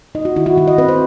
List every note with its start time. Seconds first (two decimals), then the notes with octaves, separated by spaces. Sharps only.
0.15 D#4 D#5
0.25 F#4
0.36 D#3 E4
0.46 F#4
0.57 D#3 F#4
0.68 D#5
0.78 C4 B4
0.89 C5